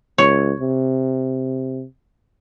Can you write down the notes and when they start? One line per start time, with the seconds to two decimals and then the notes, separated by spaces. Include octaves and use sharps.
0.18 C#2 C#5
0.60 C3